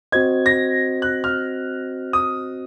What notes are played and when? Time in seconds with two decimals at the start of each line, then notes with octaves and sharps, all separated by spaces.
0.12 C4 F#4 C5 D#5 G#6
0.46 A#6
1.02 F#6
1.24 F6
2.13 D#6